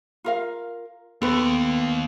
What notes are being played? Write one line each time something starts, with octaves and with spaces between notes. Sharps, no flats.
F4 A#4 F5
D#2 B3 A4 B4